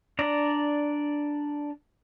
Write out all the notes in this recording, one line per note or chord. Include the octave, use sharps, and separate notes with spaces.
D4 D5 A#5